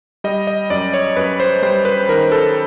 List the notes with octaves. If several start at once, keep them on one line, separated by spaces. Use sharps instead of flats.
G3 D#5
D#5
F#2 D5
C#5
F#2 B4
C5
G3 C5
B4
D#3 A#4
A4